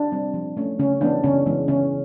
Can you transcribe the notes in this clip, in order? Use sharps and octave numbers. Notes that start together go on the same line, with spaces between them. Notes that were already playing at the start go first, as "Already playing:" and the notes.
Already playing: D4
G3 C4
F3
A3 C#4
C#3 C#4
E3 G#3 B3 D4
C#3 C#4
E3 G#3 B3
C#3 C#4